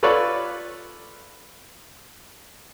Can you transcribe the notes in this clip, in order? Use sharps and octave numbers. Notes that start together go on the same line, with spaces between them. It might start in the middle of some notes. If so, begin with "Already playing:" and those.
F4 A4 B4 C#5 D5